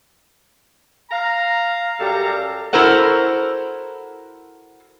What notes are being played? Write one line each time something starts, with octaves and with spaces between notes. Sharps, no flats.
F5 A#5
F#2 G3 G4 A4 F5 A#5
E4 F#4 A4 A#4 C5 F#5